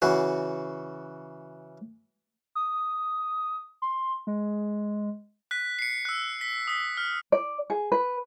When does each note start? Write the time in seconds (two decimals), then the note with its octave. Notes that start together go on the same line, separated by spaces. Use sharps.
0.02 C#3 E3 F#4
2.55 D#6
3.82 C6
4.27 G#3
5.51 F#6 B6
5.79 C7 C#7
6.05 E6 F#6
6.41 B6
6.67 D#6 B6
6.97 F6
7.32 D5
7.70 G#4
7.92 B4